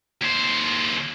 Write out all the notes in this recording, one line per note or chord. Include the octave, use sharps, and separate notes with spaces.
D#2 C5